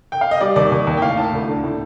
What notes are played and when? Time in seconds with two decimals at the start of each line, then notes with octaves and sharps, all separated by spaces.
0.12 G5
0.21 F5
0.31 D#5
0.41 G3 D5
0.56 D#2 D5
0.72 D#2
0.87 D#2
0.97 G5
1.02 A2 F5
1.17 A2 A5
1.33 D2
1.48 D3
1.63 A2